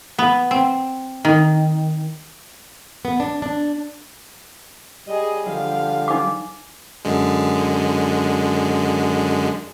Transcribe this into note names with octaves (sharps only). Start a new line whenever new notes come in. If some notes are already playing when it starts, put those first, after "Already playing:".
B3
C4
D#3
B3
D4
D4
G3 G#4 D#5
D3 F3 G3 F5
D#4 D6
F#2 D3 G#3